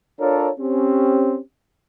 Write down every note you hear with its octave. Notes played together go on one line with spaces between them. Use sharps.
D4 F4 A4 A#4 C#5
C4 C#4 G4